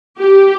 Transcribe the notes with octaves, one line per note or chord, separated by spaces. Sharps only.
G4